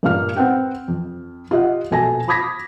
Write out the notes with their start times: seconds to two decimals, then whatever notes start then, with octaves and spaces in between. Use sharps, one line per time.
0.03 G2 A#2 A#3 F5 F6
0.36 C4 B4 F#5 G5
0.88 F2
1.51 F4 G4 D#5 E5 F#5
1.91 A#1 B2 A4 G#5 A5 A#6
2.28 B5 D6 D#6 G#6 A#6 B6